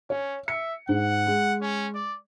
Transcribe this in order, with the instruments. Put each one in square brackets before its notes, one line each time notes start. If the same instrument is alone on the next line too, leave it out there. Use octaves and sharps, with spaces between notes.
[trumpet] C#4 [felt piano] C#5
[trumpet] E5 [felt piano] C#7
[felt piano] G#2 [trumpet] F#5
[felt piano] G#3
[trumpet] C#4
D5